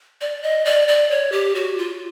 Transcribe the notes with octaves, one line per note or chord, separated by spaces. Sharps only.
D5
D#5
D5
D5
C#5
G4
F#4
F4